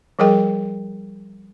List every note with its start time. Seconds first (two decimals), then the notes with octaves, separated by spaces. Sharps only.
0.19 F3 G3 G#4 A#4 D#5 G5